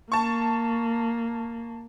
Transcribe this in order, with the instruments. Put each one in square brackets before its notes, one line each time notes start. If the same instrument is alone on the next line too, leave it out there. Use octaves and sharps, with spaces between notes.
[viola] A#3 [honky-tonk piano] A5 C#6